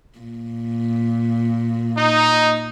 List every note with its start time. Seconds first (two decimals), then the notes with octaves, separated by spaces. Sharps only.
0.19 A#2
1.97 D#4